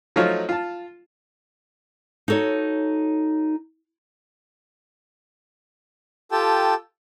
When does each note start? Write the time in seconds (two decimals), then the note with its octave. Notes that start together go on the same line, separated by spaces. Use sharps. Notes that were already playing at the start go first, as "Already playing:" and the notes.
0.16 F3 F#3 A3 D#4 F4 C#5
0.49 F4 A5
2.28 D#4 F#4 A4 C#5
6.32 F4 G4 A4 G5 A5